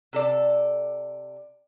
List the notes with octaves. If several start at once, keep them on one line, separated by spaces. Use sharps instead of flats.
C3 A4 D5